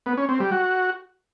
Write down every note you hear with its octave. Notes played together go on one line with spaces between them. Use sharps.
B3
C#4
C4
G3
F#4